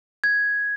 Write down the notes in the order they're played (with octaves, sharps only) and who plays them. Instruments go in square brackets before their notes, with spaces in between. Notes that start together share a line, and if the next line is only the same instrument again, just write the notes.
[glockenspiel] G#6